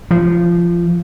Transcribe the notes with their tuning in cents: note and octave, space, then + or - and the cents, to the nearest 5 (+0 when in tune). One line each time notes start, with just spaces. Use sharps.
F3 -20